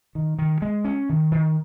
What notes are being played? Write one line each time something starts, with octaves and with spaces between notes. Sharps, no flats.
D#3
D#3
G#3
C#4
D#3
D#3